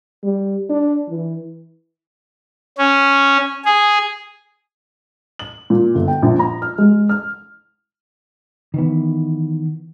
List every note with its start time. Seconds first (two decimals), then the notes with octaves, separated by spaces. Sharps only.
0.23 G3
0.69 D4
1.09 E3
2.78 C#4
3.65 G#4
5.39 F#7
5.70 A#2
5.95 G1
6.08 G5
6.22 A#1
6.39 A#5
6.62 F6
6.78 G#3
7.09 F6
8.74 D#3 E3 B3